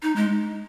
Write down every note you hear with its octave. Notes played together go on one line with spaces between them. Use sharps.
D#4
G#3